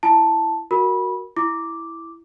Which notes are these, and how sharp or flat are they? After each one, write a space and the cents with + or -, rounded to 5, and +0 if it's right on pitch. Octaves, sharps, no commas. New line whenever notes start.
E4 +10 A5 +0
F#4 +0 A#4 +0 B5 -20
E4 +0 D6 -5